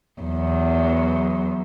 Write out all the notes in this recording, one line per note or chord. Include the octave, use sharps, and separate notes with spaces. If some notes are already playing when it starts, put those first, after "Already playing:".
E2 F#3